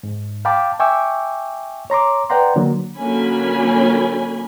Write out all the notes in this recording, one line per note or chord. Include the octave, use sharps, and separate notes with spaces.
G#2
F5 G5 A5 B5 D6
E5 G5 G#5 C#6 D6 E6
C#5 A#5 C6 D6
B4 D5 F#5 G5 A#5 C6
D3 F#3 A#3
D3 F#3 A#3 C#4 G#5 B5